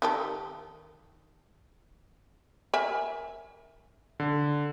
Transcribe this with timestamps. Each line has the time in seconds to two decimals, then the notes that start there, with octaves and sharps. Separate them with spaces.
0.02 D#3 G4 A4
2.74 A#4 E5 G#5
4.20 D3